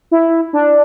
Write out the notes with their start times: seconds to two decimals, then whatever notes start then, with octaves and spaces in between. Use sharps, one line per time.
0.11 E4
0.53 D4